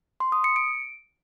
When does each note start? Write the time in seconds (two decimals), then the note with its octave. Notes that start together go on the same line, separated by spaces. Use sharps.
0.20 C6
0.32 D#6
0.44 C#7
0.56 D7